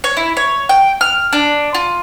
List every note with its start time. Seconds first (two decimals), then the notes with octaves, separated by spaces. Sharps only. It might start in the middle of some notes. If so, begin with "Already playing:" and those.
0.04 C#5
0.17 E4
0.37 C#5
0.69 G5
1.01 F6
1.33 D4
1.74 F4